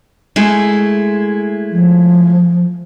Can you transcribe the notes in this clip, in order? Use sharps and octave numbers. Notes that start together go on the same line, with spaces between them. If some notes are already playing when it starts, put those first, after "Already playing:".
G#3 A3 E4
F3